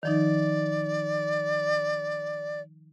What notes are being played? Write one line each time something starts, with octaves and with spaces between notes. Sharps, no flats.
D#3 F3 D#4 D5